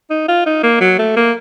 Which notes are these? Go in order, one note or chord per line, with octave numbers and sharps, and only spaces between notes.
D#4
F4
D#4
A#3
F#3
A3
A#3